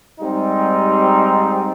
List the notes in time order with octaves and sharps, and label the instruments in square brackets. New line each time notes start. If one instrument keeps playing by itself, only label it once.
[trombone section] G#2 G3 C4 D#4